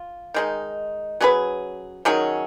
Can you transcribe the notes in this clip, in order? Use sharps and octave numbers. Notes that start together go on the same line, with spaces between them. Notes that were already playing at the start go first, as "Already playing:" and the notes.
Already playing: F4
D#3 G#3 D#4
F#3 C#4 G#4 B4
D#3 F#3 C#4 G#4